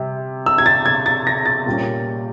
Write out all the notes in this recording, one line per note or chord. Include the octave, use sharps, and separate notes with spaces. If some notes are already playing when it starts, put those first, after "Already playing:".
Already playing: C3 G3
E6
G#6
A6
G#6
A6
A#6
A6
A#2 G3 A#3 C#4